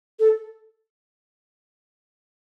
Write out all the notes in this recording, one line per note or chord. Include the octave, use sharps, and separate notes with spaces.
A4